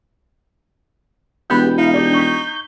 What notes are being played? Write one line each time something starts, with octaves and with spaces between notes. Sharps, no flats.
E1 B3 G4 B5 G6
D#4 E4 F5
D4 G4 D5 G6
C#6 B6